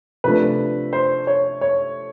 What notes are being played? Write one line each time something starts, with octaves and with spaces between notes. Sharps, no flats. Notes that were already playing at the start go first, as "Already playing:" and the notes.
C3 F3 A3 D4 B4
C5
C#5
C#5